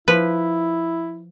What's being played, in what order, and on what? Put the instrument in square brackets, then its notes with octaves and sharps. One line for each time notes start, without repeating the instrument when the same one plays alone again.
[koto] F3 B4 [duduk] E4